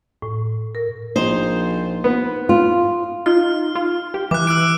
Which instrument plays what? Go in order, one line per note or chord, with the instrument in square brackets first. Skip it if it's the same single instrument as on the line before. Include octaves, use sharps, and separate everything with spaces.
[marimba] A2
A#4
[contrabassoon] A#1 [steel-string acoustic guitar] D#4 C5
[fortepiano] B3
[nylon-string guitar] F4
[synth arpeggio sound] D#4 F4 [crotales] F6
[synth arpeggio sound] F4
G4
[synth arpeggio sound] E3 [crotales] D6 F#6
[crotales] E6 F#6 D7